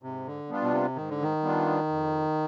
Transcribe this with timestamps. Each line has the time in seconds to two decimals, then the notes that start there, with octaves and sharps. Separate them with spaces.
0.02 G#2 C3
0.26 D3
0.49 G3 B3 D4 F4
0.62 B2
0.73 C3
0.96 G#2 D#3
1.10 D3
1.23 D#3
1.42 G3 B3 D4 F4
1.89 F2